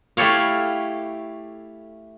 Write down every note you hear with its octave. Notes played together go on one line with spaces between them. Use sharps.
A3 E4 G4 A4 C#5 F5